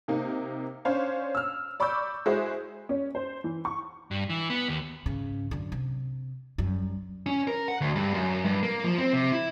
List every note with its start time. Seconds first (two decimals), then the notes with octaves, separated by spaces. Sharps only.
0.08 C3 A#3 D#4
0.85 C#4 D4 C5 C#5 F5
1.35 E6 F6
1.80 D5 B5 C#6 D6 E6 G6
2.26 G#3 E4 F#4 G#4 C5
2.89 C#4
3.15 C5
3.44 E3
3.65 C#6
4.11 G2
4.30 E3
4.50 B3
4.68 D#2
5.06 G#2 C#3
5.51 F#2 D3
5.72 C3
6.58 F#2 G3
7.26 C#4
7.48 A#4
7.68 F#5
7.81 D2
7.96 G2
8.14 F#2
8.45 G2
8.63 A#3
8.84 F3
8.98 C4
9.13 C3
9.32 E4